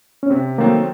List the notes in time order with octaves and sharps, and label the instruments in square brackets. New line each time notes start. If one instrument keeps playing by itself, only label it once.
[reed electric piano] C#4
[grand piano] C3 [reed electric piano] C4
[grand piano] D#3 F#3 A3 C4 [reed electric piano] A#3